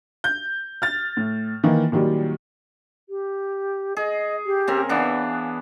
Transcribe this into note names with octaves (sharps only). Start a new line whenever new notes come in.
G6
F6 A6
A2
D#3 E3 A#3
A#2 D#3 F#3 G3
G4
G#4 D#5
G4
C#3 C4 A#4
E3 B3 D4 F5